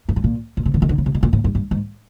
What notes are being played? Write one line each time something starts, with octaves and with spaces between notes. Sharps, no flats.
G2
A2
A#2
A#2
C3
D3
D#3
D3
C#3
C3
B2
A#2
A2
G2
G2
G#2